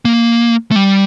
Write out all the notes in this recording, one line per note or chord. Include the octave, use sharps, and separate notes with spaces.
A#3
A3
G3